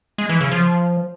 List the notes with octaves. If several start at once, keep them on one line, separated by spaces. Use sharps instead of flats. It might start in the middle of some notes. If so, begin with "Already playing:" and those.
G#3
E3
C#3
F3